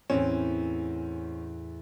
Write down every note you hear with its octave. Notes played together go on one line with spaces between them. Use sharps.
E2 A2 C4 C#4